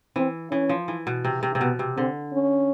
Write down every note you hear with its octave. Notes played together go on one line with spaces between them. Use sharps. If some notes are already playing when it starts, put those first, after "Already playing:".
E3 C4
E3 C#4
F3
E3
B2
C3
C3
C3
B2 B3
C3
D3 C4
C#4